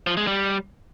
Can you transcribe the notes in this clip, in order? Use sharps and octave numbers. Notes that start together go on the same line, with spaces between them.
F3
G#3
G3